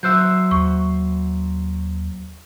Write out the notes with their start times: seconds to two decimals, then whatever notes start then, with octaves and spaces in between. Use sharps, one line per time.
0.03 F#3 C5 E5 E6 F#6 G6
0.51 D#2 C#6